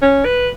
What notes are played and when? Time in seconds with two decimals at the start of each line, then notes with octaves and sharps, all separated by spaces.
0.02 C#4
0.25 B4